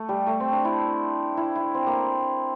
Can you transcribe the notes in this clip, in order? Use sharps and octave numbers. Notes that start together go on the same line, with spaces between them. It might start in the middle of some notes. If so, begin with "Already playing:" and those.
Already playing: A3
G3
A3
C4
D4
E4
E4
E4
C4
A#3